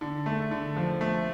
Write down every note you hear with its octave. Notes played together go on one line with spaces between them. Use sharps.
D3
A3
D3
F3
A3